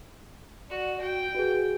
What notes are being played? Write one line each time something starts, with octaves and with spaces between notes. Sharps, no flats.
F#4 D5
F#4 G5
F#4 G#4 B4